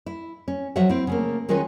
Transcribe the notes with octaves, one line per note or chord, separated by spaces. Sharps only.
E4
C#4
F3 F#3 F#4 C#5 E5 F#5
C4 E4
C#3 A3 A#3
D#3 G#3 C#4 F4 B4 C#5